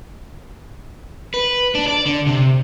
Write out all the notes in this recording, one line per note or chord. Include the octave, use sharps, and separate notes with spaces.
B4
D4
D5
D3
C3